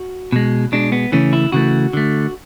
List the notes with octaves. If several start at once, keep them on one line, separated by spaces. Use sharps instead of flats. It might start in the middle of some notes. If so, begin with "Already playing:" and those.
Already playing: F#4
B2 G#3
B2 G#3 D4
B3
C#3 E3 A3 C#4
E4
C#3 E3 A3 F#4
D3 A3